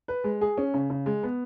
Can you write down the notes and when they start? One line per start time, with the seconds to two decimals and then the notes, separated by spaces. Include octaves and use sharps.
0.08 B4
0.24 G#3
0.41 G#4
0.58 C#4
0.74 C#3
0.90 C#3
1.06 G#3
1.23 B3